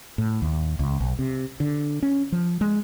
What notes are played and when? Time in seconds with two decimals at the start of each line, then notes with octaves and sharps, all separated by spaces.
0.18 A2
0.42 D#2
0.79 C#2
1.00 B1
1.19 C3
1.60 D3
2.03 C#4
2.32 F3
2.61 G#3